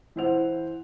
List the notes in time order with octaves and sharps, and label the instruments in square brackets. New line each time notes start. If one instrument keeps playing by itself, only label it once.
[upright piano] E3 E4 C5 F#5 F7